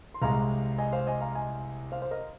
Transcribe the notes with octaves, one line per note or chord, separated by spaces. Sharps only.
C6
C2 C3 G#3 F5 A#5
D#5 G#5
C5 F5
D#5 G#5
F5 A#5
D#5 G#5
C5 F5
C5
A#4 D#5